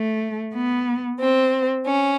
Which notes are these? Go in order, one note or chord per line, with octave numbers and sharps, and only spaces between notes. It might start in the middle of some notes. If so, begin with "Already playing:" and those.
Already playing: A3
B3
C4
C#4